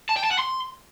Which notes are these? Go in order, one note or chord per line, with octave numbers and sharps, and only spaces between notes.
A5
G5
A5
F#5
C6